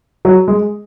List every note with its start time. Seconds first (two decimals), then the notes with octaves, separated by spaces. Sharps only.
0.25 F#3
0.48 G#3